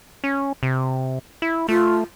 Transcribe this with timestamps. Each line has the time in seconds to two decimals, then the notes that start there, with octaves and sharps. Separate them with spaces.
0.24 C#4
0.63 C3
1.42 E4
1.68 A3 F4